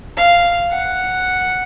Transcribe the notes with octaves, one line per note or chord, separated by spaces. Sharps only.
F5
F#5